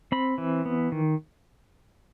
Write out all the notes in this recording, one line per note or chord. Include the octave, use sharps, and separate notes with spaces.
C4 B5
E3
B3
D#3